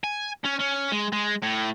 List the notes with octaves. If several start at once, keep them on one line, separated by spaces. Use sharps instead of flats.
G#5
C#4
C#4
G#3
G#3
A2